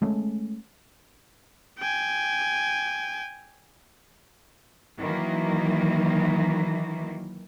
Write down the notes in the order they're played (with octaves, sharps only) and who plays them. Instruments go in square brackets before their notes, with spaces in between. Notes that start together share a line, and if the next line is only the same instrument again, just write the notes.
[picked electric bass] G#3 A3 C#4
[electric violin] G5 G#5
[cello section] D#3 E3 F#3 A#3